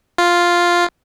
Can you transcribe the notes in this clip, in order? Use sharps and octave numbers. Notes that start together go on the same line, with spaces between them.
F4